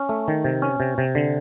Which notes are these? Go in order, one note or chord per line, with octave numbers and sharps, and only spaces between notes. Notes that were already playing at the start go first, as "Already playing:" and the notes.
Already playing: C#4
A3
D#3
C3
C#4
C3
C3
D3